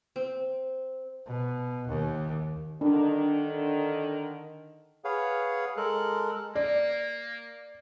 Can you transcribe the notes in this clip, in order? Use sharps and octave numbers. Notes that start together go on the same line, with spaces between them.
C4
B2
D#2
D3 D#3 D4
G#4 B4 C#5 F5 F#5
G#3 A4 A#4 F#6
A#3 D5